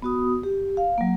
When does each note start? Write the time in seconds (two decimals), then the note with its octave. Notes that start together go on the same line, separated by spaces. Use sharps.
0.02 B3 F#4 D#6
0.43 G4
0.77 F5
0.98 F#3 A#3